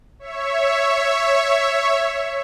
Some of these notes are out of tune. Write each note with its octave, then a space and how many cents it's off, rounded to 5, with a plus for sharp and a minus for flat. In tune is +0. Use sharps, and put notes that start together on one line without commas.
C#5 +0 E5 +10 C#6 -5